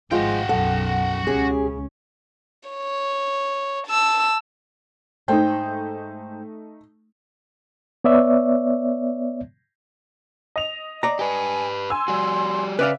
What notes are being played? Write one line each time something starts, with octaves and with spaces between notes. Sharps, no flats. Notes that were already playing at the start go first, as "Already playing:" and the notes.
G#1 F3 G#3 F4 F#4 G5
B1 F#2 A4 F#5
C#2 C#3 C#4 G4 G#4
C#5
A5 E6
G#2 A3 D#4 C5 G5
B3 C#5 D5 E5
D#5 F7
D5 A#5
G4 B4 G#5
G#5 C6 E6
G3 F#4
C#3 B4 D5 E5 F5